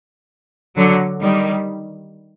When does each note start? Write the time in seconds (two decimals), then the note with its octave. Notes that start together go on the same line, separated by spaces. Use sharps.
0.76 D3 F#3
1.21 D#3 G3